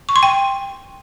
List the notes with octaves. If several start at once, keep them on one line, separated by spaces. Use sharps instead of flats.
C#6
C6
G5